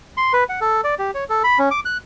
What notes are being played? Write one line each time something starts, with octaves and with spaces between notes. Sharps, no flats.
C6
B4
F#5
A4
D5
G4
C#5
A4
B5
C#4
D6
F#6